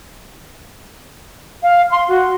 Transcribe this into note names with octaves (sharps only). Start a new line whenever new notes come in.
F5
C6
F#4